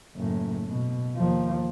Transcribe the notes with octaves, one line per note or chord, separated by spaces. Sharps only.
F#1 A2
B2
D#2 F3